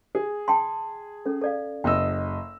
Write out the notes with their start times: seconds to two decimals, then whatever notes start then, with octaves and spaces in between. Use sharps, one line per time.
0.15 G#4
0.48 G5 A5 C6
1.26 C#4 A4
1.41 A4 D5 F5
1.84 F#1 D#5 G5 E6